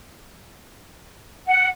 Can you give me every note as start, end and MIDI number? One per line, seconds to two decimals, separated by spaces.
1.46 1.67 78